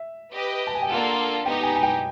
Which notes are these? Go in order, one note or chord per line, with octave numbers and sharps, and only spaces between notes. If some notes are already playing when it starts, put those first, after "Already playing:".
Already playing: E5
G4 B4 D#5
A5
G#5
G5
A#3 D4 F4 A4 F#5
B3 D#4 G4 G5
G#5
G#5
G5